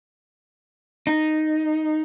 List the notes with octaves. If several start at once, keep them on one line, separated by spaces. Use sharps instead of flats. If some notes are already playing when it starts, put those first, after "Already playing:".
D#4